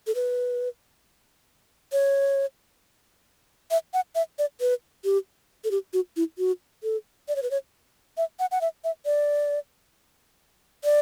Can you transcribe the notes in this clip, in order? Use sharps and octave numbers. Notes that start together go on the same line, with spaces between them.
A4
B4
C#5
E5
F#5
E5
D5
B4
G4
A4
G4
F#4
E4
F#4
A4
D5
C#5
B4
C#5
E5
F#5
F#5
E5
E5
D5
D5